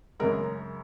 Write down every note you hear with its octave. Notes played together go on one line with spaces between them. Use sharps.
F#2 C#3 G#3 A#4